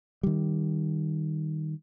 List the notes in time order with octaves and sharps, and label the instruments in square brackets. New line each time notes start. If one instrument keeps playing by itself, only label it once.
[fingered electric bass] D#3 G3